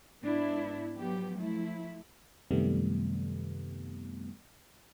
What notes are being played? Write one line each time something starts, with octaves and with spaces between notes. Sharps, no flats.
G#2 B3 D4 E4
F3 F#3 B3 G4
F3 A3 E4
F#2 C3 D#3 G3 A3 B3